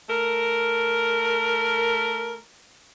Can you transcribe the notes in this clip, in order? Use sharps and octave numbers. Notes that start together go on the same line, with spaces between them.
A3 A#4